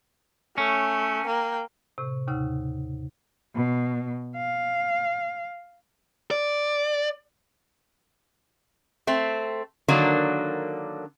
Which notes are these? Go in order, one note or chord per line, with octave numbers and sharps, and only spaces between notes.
A3 C#4
A#3 G5
A2 C3
D#2 A2 C#3 D#4 F#5 E6
B2
F5
D5
A3 C4
D3 D#3 F#3 A#3 D4